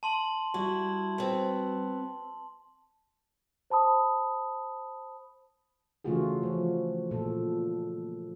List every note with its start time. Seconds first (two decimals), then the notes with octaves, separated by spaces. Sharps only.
0.03 A5 C6 F#7
0.54 G3 E4 F#4
1.18 B3 C4
3.70 C5 A5 B5 D#6
6.04 C#3 E3 A3 F4 F#4 G#4
6.43 F3
7.11 A#2 A4